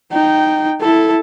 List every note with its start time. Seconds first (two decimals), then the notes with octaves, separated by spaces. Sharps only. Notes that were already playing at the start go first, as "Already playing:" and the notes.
0.12 D#4 G5
0.81 E4 A4